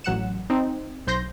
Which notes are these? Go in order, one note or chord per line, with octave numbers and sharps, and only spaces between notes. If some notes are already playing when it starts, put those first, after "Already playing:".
A1 F#3 F#5 F#6 C#7 E7
C4 D#4
B1 C5 C6 G6 A#6